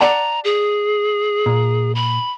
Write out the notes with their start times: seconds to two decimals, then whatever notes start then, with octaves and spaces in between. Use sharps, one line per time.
0.01 D5 F#5 A5 A#5
0.44 G#4
1.46 A#2
1.95 B5